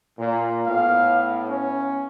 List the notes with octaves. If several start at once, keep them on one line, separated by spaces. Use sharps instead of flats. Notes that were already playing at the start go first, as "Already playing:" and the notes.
A#2
A2 B3 F5
C#4